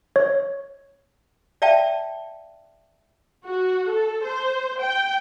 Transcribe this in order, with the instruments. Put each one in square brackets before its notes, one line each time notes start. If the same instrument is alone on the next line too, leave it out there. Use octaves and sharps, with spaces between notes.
[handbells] C#5
[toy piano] D5 E5 F5 G5 A5
[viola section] F#4
A4
C5
G5